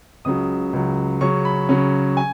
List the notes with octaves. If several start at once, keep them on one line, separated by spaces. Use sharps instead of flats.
C#2 C#3 F#3 D#6
C#2 C#3 F#3
C#3 F#3 C#4 C#6
B5
C#3 F#3 C#4
G#5